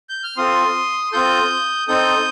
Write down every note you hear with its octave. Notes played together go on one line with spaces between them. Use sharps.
G6
F6
C4 F4 A4 C6 D#6
C4 F4 A4 D#6 G6
C4 D#4 A4 D#6 G6